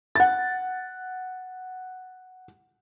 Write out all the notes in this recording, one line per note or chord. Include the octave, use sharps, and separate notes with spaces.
F#5 A6